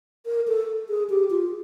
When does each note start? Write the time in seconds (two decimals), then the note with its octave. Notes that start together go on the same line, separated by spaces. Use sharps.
0.26 A#4
0.48 A4
0.89 G#4
1.10 G4
1.31 F4